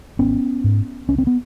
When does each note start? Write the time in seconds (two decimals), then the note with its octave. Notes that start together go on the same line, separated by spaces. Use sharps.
0.19 G#1 B3 C#4
0.64 G#2
1.09 C#2 C#4
1.18 C4
1.27 B3